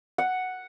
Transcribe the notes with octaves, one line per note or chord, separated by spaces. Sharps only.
F#5